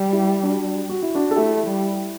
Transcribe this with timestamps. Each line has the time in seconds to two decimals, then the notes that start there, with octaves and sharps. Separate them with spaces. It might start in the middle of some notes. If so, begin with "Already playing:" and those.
Already playing: G3
0.13 E4 G4
0.43 D4 F#4
0.89 F#4
1.02 E4
1.15 D4 F#4
1.31 A4
1.35 A3 E4 G4
1.67 G3